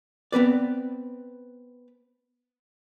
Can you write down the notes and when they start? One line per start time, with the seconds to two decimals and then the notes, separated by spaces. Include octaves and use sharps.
0.32 B3 C4 B4 D5